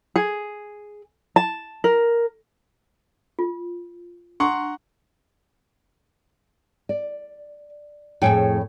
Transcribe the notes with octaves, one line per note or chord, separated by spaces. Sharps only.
G#4
A5
A#4
F4
D4 F#5 A#5 C6 C#6 D#6
D5
F2 A2 G#4 A4 C#5 G5